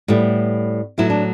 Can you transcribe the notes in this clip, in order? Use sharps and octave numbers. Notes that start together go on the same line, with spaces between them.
A2 G3 B3
A2 F#3 B3 E4
D4